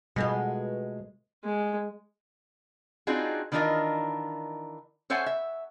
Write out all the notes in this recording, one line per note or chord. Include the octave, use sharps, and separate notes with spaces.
B2 G#3 A3 F4
G#3
C4 D4 D#4 F4 F#4 G#4
D#3 E3 D4 F4 A#4 D#5
A4 C5 C#5 E5 F#5 G#5
E5